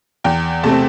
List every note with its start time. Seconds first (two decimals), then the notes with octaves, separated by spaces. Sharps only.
0.24 E2 G5
0.63 C3 A3 C4 A5